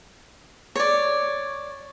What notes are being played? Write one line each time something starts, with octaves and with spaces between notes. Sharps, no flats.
C#5 D5